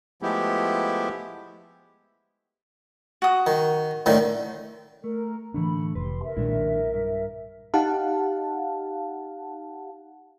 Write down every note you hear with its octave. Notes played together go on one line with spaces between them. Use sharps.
F3 G#3 A3 B3 E4 G4
F#4 D#6
D#3
A2 D3 D#3
A3 A#4
A2 D3 E3 A3 D4 B5
F1 G4 B4 C6
A#4 E5
B1 A#2 D#3 G#3 D4 E4
G2
D#4 G4 F5 F#5 A5